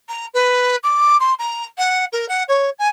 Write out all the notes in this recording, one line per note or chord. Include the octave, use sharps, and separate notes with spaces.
A#5
B4
D6
C6
A#5
F#5
A#4
F#5
C#5
G#5